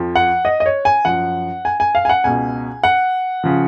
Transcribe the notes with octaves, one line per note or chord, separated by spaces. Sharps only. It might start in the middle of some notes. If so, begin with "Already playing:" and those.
Already playing: F2 F3
F#5
D#5
D#5
C#5
G#5
F#2 F3 F#5
G#5
G#5
F5
G#5
F#5
C#2 B2 G#5
F#5
C#3 F3